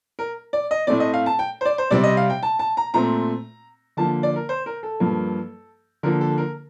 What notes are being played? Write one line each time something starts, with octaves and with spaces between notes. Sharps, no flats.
A#4
D5
D#5
A2 A3 C4 D5
D#5
F5
A5
G5
C5
D5
C5
C3 G3 C4 D5
D#5
F5
G5
A5
A5
A#5
A#2 A3 C4 A#5
D3 F3 A#3 A5
D5
A#4
C5
A#4
A4
G2 F3 A#3
D3 F3 A#3 A#4
A4
A#4